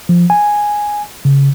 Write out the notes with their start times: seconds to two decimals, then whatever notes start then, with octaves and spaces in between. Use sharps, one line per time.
0.09 F3
0.30 G#5
1.25 C#3